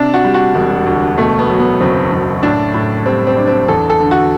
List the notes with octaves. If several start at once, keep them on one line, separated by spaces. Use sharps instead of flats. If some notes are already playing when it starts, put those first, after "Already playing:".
Already playing: C3 D4
F#4
G3
F#4
E1
D2
B2 A3
B3
F#3
B3
F#1 C4
F#1
A2 D4
A2
G3 C4
C4
D4
C4
E2 A4
A4
D3
F#4